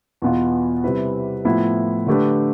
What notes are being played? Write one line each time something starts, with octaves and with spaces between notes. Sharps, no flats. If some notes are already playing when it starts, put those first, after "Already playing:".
E2 B2 B3 F4
C3 G3 C4 E4 B4
A2 F3 B3 E4
D3 A3 D4 G4 B4